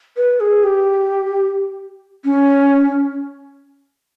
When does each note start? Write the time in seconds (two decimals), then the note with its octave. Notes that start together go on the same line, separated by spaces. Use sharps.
0.17 B4
0.40 G#4
0.63 G4
2.24 C#4